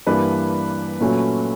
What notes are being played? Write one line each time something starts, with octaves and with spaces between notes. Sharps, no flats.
G2 E3 G3 A#3 D4 B4
A#2 F#3 A3 C#4